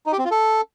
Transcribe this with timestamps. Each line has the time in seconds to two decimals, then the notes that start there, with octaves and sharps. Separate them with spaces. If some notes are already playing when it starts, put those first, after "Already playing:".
0.06 D#4
0.12 G4
0.19 C4
0.25 F4
0.31 A4